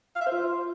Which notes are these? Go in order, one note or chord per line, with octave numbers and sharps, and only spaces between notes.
F5
E5
C5
F4